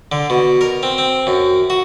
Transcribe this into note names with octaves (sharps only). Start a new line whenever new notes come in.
D3
B2
A#4
C4
C4
F#2
F#4